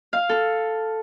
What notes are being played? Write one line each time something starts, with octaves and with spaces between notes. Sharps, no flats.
F5
A4